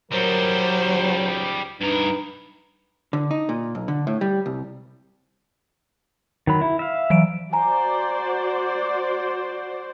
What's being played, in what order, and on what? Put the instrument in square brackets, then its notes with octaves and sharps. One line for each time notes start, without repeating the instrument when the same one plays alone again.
[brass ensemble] G1 A#4 [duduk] F#3 [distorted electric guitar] G3 D#4 [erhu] C5
[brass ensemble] C#2
[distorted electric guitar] G2 A#4 [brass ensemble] D4 B4 [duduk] D#4
[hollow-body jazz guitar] D3
D#4
A#2
B1
D3
A2
G3
C2
[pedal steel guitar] D#3 F#3 B5
E4
E5 F5
[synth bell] E3 F#3 D7
[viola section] F#4 C5 D5 [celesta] G#5 A#5